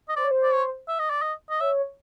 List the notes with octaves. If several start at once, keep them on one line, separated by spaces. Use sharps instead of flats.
D#5
C5 D5
C#5
C5
D5
C#5
E5
D#5
D5
D#5
D#5
C#5 E5